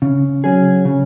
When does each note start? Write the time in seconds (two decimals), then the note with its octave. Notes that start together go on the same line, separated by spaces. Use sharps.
0.02 C#3
0.44 F#3 C#4 G#4
0.85 C#3